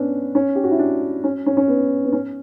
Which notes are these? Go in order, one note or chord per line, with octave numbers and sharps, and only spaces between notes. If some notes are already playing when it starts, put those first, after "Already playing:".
Already playing: B3 C#4 D4
C#4
G4
F#4
E4
D4
C#4
C#4
C#4
B3
B3
C#4